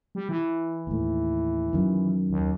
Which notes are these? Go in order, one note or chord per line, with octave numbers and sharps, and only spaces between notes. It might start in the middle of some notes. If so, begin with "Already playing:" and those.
G3
E3
D#2 A2
F#2 D#3
D#2